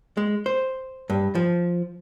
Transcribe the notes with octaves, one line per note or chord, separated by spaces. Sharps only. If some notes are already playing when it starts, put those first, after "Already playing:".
G#3
C5
G2
F3